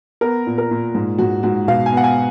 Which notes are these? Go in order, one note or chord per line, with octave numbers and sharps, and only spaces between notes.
B3 A#4
A#2
A#4
A#2
G#2
G#2 F#4
G#2 F#4
B2 F5
G#5
B3
F#5
G#5